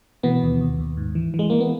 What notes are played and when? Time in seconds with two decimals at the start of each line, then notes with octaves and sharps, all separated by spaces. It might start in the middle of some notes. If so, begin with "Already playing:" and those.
0.23 B2 E3 B3
0.43 D#2
0.61 D#2
0.79 D#2
0.97 G#2
1.15 E3
1.34 E3
1.39 G#3
1.50 E3 A#3
1.60 B3